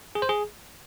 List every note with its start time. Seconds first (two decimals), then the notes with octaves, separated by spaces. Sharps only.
0.15 G#4
0.22 C5
0.29 G#4